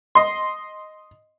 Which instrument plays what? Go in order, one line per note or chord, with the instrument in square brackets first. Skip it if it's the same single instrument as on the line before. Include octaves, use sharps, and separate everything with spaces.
[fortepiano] D#5 C6